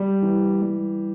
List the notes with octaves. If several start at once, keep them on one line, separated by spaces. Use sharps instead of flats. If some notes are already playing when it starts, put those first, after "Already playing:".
Already playing: G3
E3
G3